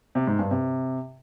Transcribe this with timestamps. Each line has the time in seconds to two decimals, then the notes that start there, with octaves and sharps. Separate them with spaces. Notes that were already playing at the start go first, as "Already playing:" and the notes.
0.15 C3
0.27 G#2
0.39 G2
0.51 C3